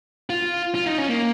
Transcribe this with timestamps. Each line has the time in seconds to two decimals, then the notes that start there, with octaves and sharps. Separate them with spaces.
0.30 F4
0.75 F4
0.87 D#4
0.98 C#4
1.09 A#3